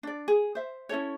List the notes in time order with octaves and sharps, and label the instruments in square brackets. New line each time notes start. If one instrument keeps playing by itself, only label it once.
[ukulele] D4 D5
G#4
C5 E5
C#4 E4 A4 C#5